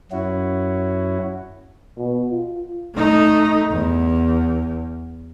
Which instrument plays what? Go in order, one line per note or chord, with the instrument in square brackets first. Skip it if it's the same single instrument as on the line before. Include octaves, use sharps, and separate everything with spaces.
[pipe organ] F#2 C#4 E4 F#4
[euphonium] B2
F4
[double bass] A3 D#4
E2